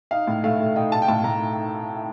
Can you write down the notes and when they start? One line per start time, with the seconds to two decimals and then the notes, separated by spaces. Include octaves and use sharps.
0.11 D#4 F5
0.27 A2
0.44 A3 F5
0.60 A3
0.76 D#4 G5
0.92 D#4 A5
1.02 G5
1.08 A2 A5
1.24 A2 A#5